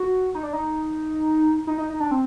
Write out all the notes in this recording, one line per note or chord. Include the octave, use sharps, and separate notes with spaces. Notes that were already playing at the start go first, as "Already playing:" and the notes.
Already playing: F#4
D#4
D4
D#4
D#4
D#4
D#4
D4
C4